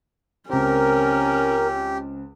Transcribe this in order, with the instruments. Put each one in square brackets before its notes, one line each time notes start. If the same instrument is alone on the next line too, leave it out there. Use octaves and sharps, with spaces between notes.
[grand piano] C#2 C4 [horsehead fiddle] C#4 [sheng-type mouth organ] G4 [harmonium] A#4